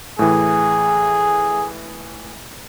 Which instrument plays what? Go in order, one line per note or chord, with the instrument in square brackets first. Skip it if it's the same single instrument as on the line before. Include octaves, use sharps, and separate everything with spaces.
[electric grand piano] A2 E3 [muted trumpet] G#4